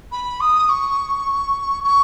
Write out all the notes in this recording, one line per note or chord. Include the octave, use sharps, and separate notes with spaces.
B5
D#6
C#6
C#6